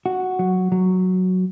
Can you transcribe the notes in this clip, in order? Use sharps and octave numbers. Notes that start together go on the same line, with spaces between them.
F#4
F#3
F#3